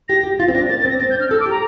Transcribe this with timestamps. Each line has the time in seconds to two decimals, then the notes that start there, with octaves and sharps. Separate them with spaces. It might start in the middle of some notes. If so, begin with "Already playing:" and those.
0.08 G4 A#6
0.23 G4
0.39 F4 A6
0.48 C4
0.54 D4 A#6
0.70 A#3 A6
0.80 A6
0.85 C4
0.90 A#6
1.00 C4 A6
1.10 G6
1.15 D4
1.20 F6
1.30 A4 E6
1.40 D6
1.46 G4
1.51 A#5